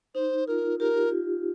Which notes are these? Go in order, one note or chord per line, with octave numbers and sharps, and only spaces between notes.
D#4 C5
F4 A#4
G4 A#4
F4